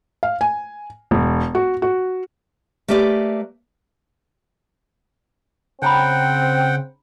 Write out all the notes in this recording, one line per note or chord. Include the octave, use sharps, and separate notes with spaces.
F5
G#5
E1
F#4
F#4
A3 A#3 G4 B4 D5
C#3 C4 D4 F#5 G5 A#5 B5